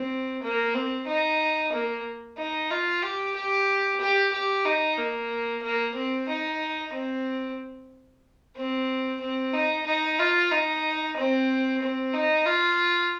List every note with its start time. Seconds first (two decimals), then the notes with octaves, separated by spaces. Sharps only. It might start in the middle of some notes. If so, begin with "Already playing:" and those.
Already playing: C4
0.43 A#3
0.74 C4
1.07 D#4
1.73 A#3
2.38 D#4
2.70 F4
3.02 G4
3.35 G4
4.00 G4
4.33 G4
4.65 D#4
4.98 A#3
5.62 A#3
5.95 C4
6.29 D#4
6.93 C4
8.56 C4
9.21 C4
9.53 D#4
9.86 D#4
10.19 F4
10.51 D#4
11.17 C4
11.82 C4
12.13 D#4
12.46 F4